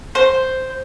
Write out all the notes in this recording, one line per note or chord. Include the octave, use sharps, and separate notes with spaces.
C5